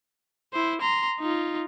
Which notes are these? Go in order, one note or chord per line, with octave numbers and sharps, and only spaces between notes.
E4 C5
A#5 C6
D#4 F4